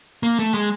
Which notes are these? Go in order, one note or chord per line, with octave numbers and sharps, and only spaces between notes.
A#3
A3
G#3